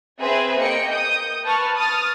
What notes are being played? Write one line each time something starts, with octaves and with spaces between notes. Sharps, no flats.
C4 G#4 B4 E5 G#5
A#3 D#5 G5 C#7
D#6 G6
B4 A5 C#6 F6
D#6 F6 A6